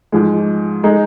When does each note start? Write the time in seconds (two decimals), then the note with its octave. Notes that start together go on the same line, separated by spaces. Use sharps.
0.12 G#2 F3 G#3
0.84 G#3 D#4